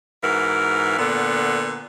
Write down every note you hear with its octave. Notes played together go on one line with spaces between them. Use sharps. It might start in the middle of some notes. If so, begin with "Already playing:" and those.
G#2 E3 F#4 A#4
A#2 D3 B3